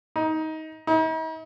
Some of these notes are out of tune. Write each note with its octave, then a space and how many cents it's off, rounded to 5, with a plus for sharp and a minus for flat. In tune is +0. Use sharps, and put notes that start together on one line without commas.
D#4 +20
D#4 +45